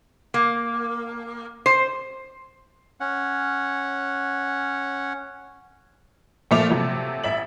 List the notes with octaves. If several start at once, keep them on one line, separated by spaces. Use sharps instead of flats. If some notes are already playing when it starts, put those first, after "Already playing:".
A#3
C5
C#4 F#5
A#2 F3 A3 F4 D6 F7
C3 F3 F#3 A3
A1 E5 F#7